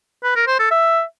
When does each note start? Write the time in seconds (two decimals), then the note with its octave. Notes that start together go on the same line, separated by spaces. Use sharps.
0.24 B4
0.36 A#4
0.48 C5
0.59 A4
0.71 E5